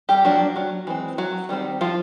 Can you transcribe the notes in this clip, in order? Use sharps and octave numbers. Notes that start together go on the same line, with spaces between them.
G3 G4
F3 F#3 A#3 D4 F#4
F#3 F#4
E3 G#3 C4
F#3 F#4
D#3 G3 C4
F3 F4